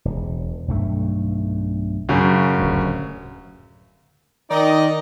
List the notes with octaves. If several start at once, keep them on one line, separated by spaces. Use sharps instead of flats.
E1
B1 G2 A3
F#2 C#3
D1 G2
D#3 D#4 D5 D#5